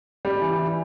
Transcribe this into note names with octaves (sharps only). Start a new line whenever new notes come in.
G3
E3
E3